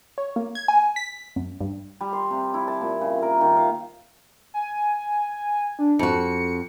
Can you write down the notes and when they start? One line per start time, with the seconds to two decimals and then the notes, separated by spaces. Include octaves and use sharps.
0.18 C#5
0.36 A#3
0.55 G#6
0.68 G#5
0.96 B6
1.36 F#2
1.61 G2
2.01 G3
2.13 C6
2.31 C3
2.54 E4
2.68 A5
2.81 A#2
3.01 C#3
3.22 A#4
3.41 D#3
3.57 F5
4.54 G#5
5.79 D4
5.99 F2 F#4 C#7